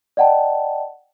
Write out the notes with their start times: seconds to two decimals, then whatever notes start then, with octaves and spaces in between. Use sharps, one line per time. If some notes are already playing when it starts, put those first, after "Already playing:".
0.17 D5 D#5 F#5 G5 A5